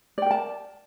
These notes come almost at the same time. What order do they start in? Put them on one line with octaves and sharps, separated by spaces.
D5 G5 A#4 A5